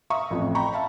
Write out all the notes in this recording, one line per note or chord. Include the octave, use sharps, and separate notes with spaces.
E5 F5 A#5 C#6 D#6
A1 F2 F3
G5 A#5 B5 C#6
E5 F5 A5 B5